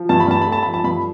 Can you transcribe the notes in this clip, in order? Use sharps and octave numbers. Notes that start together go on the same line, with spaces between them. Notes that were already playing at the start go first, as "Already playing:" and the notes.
Already playing: F3
G2 A5
B5
G2 A5
A3 B5
A5
F3 B5
A5
G2 B5